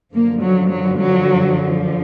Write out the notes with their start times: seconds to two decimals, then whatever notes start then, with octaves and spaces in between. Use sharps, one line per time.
0.13 F#2 D3 F3 A#3
0.42 F#3
0.71 F#3
0.99 F#3